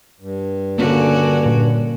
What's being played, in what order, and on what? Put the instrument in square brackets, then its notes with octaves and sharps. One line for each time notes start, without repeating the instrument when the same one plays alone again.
[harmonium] G2
[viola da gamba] D3 F#4 [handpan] A#3 C#4
[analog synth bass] A#2